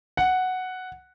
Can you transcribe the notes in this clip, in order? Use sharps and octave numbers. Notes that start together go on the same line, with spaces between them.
F#5